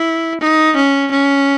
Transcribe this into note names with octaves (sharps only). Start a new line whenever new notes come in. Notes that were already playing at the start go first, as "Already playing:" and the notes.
Already playing: E4
D#4
C#4
C#4